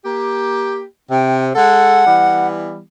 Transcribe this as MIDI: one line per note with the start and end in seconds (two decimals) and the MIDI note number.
0.05 0.83 58
0.05 0.83 67
1.10 1.50 48
1.10 1.43 79
1.55 2.01 56
1.55 2.01 69
1.55 2.48 78
2.06 2.82 52
2.06 2.82 55
2.06 2.82 59